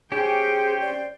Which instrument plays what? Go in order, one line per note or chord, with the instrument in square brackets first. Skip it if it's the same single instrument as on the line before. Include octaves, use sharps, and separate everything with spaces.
[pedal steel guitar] C#4 G4 [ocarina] G#4 [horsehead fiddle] C5 G5
[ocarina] D5